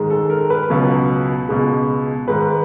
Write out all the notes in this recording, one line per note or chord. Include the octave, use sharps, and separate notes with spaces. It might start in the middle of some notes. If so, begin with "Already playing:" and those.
Already playing: G#2 D#3 G#3
A4
A#4
B4
C#2 B2 F#3
C#2 B2 G#3
G#2 D#3 G#3 B4